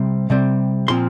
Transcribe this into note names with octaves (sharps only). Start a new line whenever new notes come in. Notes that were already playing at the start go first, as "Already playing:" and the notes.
Already playing: C3 G3 C4
C3 G3 C4
A#2 F3 C4 C6